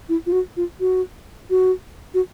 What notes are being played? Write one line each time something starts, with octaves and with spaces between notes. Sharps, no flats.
E4
F4
F#4
F4
F#4
F#4
F#4